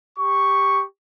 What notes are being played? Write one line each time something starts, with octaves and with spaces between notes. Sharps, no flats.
G4 C#6